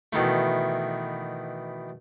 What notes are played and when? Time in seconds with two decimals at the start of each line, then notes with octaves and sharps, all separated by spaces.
0.13 B2 D#3 E3 A3